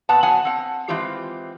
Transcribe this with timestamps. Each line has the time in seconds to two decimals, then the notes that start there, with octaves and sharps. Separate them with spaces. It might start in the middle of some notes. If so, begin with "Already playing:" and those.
0.09 A#2 B3 F#5 A5
0.23 F#3 B3 F#5 G#5
0.45 C4 F#5
0.88 E3 G#3 C4 F4 G4